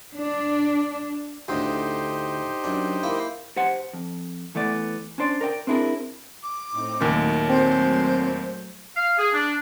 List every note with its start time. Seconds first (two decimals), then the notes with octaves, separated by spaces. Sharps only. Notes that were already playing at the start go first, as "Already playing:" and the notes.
0.15 D4
1.48 D2 A2 D3 D#4 G4 C5
2.64 F#2 D4
3.03 A#3 E4
3.56 G4 C5 F#5
3.93 F2
4.55 E3 A3 B3 D5
5.18 C#4 D4 C5 D5
5.41 A#4 D5 G5
5.67 C4 D4 E4 G#4 A#4
6.43 D6
6.72 A2 C4 D#4
7.00 D#2 A#2 F#3 A3
7.49 C4 C5
8.96 F5
9.18 G#4
9.34 D4